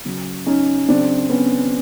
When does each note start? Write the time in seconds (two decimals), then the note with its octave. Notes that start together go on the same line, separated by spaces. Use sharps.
0.05 C#3 F#3
0.46 C#4 D#4
0.89 C#3 F#3 C4 D4
1.30 B3 C#4